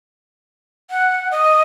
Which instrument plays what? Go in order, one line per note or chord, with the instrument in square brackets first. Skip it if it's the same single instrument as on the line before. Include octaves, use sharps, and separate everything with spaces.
[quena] F#5
D#5